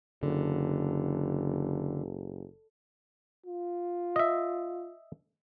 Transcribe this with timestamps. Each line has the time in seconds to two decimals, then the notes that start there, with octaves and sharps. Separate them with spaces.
0.23 F#1 D3
3.46 F4
4.16 D#5 E5